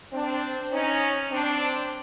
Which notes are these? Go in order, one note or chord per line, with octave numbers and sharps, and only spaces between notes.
C4 D4
C#4 D#4
C4 D4